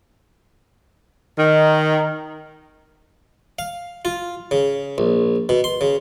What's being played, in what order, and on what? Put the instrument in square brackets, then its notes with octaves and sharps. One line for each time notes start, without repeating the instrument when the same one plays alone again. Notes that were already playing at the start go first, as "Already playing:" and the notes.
[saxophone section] D#3
[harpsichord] F5
F4
C#3
A#1
B2
C6
C#3